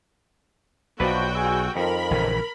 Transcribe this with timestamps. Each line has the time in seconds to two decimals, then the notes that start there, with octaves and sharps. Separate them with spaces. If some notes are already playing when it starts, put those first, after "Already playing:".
1.00 B1 C3 F3 F#4 B4 D5 G5
1.35 G#4 E6
1.76 F2 D#3 F3 A#4 B5
2.11 A#1 C#3 E3